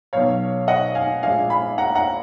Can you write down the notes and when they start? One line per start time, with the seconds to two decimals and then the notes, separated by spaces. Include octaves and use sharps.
0.13 B1 B2 F#3 C#5 F5
0.68 D#5 F#5
0.95 F5 G#5
1.23 A#1 A#2 F3 G#3 F5 G#5
1.50 G#5 B5
1.78 F#5 A#5
1.95 F#5 A#5